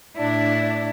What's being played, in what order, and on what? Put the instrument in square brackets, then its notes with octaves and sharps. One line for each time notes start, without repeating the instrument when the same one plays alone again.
[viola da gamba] A2 E4 [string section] D4